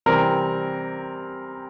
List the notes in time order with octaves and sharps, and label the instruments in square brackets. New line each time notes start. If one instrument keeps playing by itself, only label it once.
[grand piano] C3 E3 G3 C4 A#4